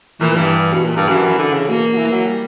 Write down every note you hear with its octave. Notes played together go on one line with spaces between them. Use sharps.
A#2 E3
A#2
G2
B2
A#2
G2
F#2 E3
D3
C#3
B2 A#3
F#3
E3
F#3
G3